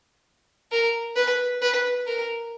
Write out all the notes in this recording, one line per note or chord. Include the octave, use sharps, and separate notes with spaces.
A#4
B4
B4
A#4